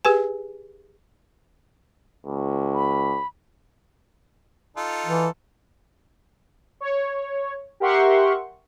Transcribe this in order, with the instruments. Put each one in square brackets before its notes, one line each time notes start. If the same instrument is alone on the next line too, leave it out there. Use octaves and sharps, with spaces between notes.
[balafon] G4 G#4 B4 G#5
[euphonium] C#2
[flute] B5
[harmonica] D#4 F4 A4
[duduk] E3
[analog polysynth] C#5
G4 A#4 E5 F#5 C6 C#6